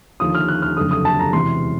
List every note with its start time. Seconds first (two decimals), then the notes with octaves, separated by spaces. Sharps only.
0.20 D#2 D3 F3 D#6
0.35 F6
0.48 F#6
0.62 F6
0.77 F#1 F2 D3 D#6
0.91 D#6
1.05 A5
1.19 A#5
1.33 E1 E2 C3 C6